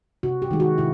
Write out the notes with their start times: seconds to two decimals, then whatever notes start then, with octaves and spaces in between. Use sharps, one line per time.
0.23 C3 F#4
0.42 G4
0.51 D#3 G#3
0.60 F#4
0.78 C3 E4